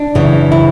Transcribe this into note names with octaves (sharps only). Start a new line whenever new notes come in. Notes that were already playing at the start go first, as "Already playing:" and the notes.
Already playing: D4
F#2 C#3 E3
E4